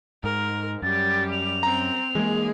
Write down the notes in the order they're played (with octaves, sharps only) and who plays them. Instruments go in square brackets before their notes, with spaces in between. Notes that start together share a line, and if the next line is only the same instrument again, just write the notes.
[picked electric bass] G#2 [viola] A#4
[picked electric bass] F#2 [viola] G3 G4 [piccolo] A6
[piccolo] F7
[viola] C4 [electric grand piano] A#5
[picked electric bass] E3 A#3 [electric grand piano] G#3 [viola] G#4